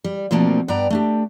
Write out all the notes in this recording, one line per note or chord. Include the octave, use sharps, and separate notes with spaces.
G3
B2 F3 A3 A#3 C4 D4
G2 B3 D5 G5 A#5
A3 D4 G4